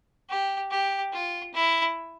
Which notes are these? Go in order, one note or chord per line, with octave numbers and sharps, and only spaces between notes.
G4
G4
F4
E4